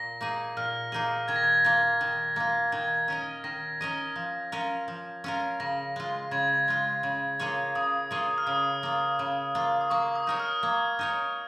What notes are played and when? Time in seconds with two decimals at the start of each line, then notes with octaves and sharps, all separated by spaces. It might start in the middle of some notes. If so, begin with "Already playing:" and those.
Already playing: A#2 A#6
0.21 A#3 D#4 G#4
0.57 A#2 F6
0.92 A#3 D#4 G#4
1.28 D#3 G#6
1.36 A#6
1.43 G#6
1.65 A#3 F4
2.01 D#3
2.36 A#3 F4
2.72 D#3 G#6
3.08 C#4 A#4 D#5
3.44 D#3 A#6
3.81 C#4 A#4 D#5
4.16 F3
4.52 C#4 F4 A#4
4.88 F3
5.24 C#4 F4 A#4
5.60 C#3 A#6
5.96 G#3 F4
6.31 C#3 G#6
6.68 G#3 F4
7.03 C#3
7.39 A#3 F4 G#4 C#5
7.75 C#3 D#6
8.11 A#3 F4 G#4 C#5
8.38 F6
8.47 C#3 D#6
8.83 A#3 F4
9.19 C#3
9.55 A#3 F4
9.81 D#6
9.90 A#3 C#6
10.16 D#6
10.27 D#4 A#4 C#5
10.40 F6
10.63 A#3 G#6
10.99 D#4 A#4 C#5